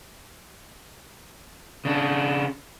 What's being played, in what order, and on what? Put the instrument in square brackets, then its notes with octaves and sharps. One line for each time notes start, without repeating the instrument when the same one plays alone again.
[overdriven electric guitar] C#3 D4